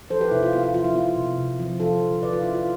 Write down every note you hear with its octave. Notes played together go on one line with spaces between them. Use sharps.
F3 A4 C5
G4 B4
C3 E4
F4
B3 F4
F4
F3 F4
E4
B3 F4
C3
C3
F3
F3 F4 A4
D3
D3 B4 D5
F4
D3 E4
F4